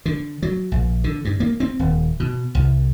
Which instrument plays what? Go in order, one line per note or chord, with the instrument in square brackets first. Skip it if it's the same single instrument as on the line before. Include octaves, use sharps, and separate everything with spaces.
[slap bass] D3
F#3
A#1
D3
G2
A#3
C4
D#1
B2
C2